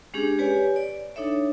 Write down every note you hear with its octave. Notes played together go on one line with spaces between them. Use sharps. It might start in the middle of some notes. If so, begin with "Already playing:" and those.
G#3 C#4 D4 G4 G#4
G4 B4 C#5 D5 G#5
D5
D4 D#4 A4 C#5 E5